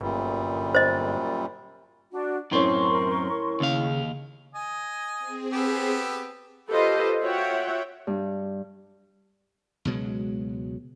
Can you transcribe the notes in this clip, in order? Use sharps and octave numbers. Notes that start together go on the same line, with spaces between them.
G1 F#2 A#2 G3
C5 D#5
D4 F#4
F#2 A2 C4 C#4 A#4 C6 C#6
D#2 C#3 F5
D#5 G#5
C4 G#4
B3 G4 A4
F4 G4 A4 B4 C5 D#5
F4 F#4 C#5 E5 F#5 G5
G2
C#2 B2 F#3 G#3